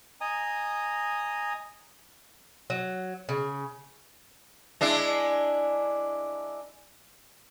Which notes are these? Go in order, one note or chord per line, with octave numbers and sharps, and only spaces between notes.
D#5 G#5 A#5 D#6
F#3
C#3
G#3 D4 E4